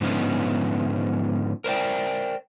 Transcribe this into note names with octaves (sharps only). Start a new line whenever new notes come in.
G#2 D3 F3 B3 C#4 D#4
A#4 C5 D5 G5